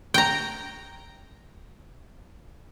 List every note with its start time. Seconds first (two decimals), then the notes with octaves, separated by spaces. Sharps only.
0.14 G5 A#5